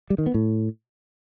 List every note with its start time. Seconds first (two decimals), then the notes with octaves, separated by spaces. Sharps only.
0.10 G3
0.18 D#3
0.26 B3
0.34 A2